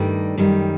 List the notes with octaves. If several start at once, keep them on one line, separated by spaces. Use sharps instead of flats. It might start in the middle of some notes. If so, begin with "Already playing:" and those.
Already playing: G2 D#3 G3 A3
F#2 D#3 G3